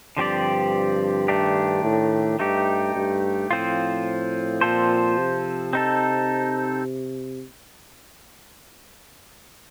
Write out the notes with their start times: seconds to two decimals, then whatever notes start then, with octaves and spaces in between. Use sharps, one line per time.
0.17 G2 D3 F3 C4 G4 D5
1.28 D#3 A3 D4 G4
1.84 A2
2.39 G2 A3 D#4 G4
2.95 G2
3.51 A2 F3 C4 F4
4.61 A#2 F3 C4 F4 A4 C5
5.18 C3
5.73 C4 D#4 A4